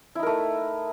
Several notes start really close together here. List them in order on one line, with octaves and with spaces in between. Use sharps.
E4 D#4 A#4 A3